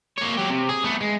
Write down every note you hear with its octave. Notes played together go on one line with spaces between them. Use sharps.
A#3 C#5
F#3 G4
C3
G#4
A3 B3
G#3